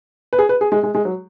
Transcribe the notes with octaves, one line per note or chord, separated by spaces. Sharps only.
B4
G#4
B4
G#4
G#3
G#3
G#3
F#3